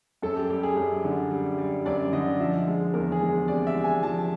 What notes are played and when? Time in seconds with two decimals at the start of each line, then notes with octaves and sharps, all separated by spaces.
0.22 F#2 A4
0.36 G4
0.50 G3 G4
0.63 G#4
0.77 F#2
1.05 D3
1.31 G3
1.58 G3
1.86 F#2 D5
2.13 D3 D#5
2.40 F3 E5
2.68 G#3
2.94 E2 A#4
3.12 G#4
3.22 G#3
3.48 C3 D5
3.67 E5
3.75 G#3
3.84 G#5
4.03 F3 A5